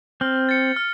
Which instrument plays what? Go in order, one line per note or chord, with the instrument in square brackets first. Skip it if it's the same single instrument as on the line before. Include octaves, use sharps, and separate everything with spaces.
[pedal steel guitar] C4 [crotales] F6
[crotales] A6 C#7
F6